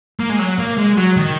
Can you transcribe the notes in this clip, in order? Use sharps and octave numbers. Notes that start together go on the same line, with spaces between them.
A#3
G#3
F#3
A#3
G#3
F#3
D#3